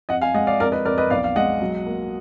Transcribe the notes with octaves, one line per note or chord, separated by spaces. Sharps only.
F2 D#5 F#5
F5 G#5
G#3 D#5 F#5
D5 F5
F2 A#4 D5
B4 D#5
F2 A#4 D5
B4 D#5
B1 D5 F5
F5
G#3 D#5 F#5
F#3
A#3